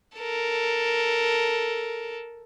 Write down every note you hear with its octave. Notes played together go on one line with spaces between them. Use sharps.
A4 A#4